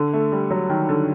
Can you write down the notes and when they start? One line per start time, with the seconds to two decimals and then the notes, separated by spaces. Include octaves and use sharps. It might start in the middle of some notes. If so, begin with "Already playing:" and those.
Already playing: D3
0.13 A3
0.32 G3
0.51 F#3
0.69 D#3
0.89 D3